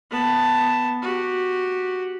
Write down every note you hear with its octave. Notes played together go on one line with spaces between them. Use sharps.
B3 A5
F#4 G4